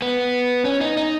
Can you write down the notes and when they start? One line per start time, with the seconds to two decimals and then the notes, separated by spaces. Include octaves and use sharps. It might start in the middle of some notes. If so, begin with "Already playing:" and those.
0.02 B3
0.65 C#4
0.81 D#4
0.97 D#4